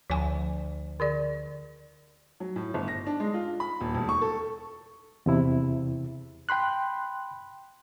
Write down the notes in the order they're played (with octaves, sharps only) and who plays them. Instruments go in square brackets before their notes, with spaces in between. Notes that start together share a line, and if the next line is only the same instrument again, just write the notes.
[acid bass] D2 [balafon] F3 G#5
[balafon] D3 G#4 D5
[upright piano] F#3
A2
G1
A#6
D4
G#3
F4
B5
D#1
E1
C#6
A4
[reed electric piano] E2 C3 E4
G5 B5 C6 F#6